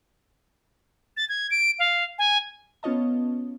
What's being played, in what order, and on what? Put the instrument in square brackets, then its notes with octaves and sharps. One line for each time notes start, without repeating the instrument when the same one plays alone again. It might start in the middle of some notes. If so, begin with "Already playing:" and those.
[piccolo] A6
G#6
D7
F5
G#5
[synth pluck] B3 C#4 F4 C#5 D#5 A5